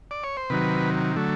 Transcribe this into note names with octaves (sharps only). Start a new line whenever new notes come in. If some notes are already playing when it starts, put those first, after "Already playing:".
D5
C#5
C5
C3 D#3 F#3 B4
D3 F#3 A3